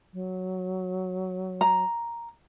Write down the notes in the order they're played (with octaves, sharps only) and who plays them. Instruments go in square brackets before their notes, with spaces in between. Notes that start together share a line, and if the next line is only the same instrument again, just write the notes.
[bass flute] F#3
[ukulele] A#5